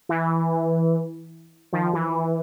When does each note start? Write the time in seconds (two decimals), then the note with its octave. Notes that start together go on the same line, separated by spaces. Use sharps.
0.09 E3
1.73 D#3 F3
1.93 E3